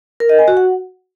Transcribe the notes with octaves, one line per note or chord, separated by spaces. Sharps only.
A#4
D#5
G#5
F#4
F#5